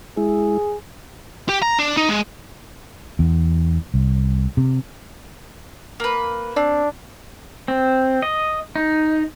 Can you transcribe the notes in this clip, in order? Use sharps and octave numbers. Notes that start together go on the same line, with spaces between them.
G#3 E4 G#4
G4
A#5
D4
D#4
G#3
E2
C2
C3
A#3 B4
C4 D4
C4
D#5
D#4